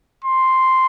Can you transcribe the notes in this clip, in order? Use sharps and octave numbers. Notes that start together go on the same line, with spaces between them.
C6